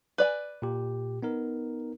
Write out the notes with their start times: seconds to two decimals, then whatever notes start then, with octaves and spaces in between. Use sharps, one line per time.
0.18 B4 D5 G#5
0.62 A#2 G4
1.22 B3 D#4 A#4